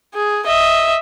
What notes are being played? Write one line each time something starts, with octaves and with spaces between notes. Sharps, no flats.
G#4
D#5 E5